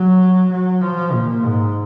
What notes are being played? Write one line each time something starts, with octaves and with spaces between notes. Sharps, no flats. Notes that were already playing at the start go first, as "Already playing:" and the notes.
Already playing: F#3
F#3
F3
A#2
G#2